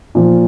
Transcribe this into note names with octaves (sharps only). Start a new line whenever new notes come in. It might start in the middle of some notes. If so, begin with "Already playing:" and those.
A#2 F3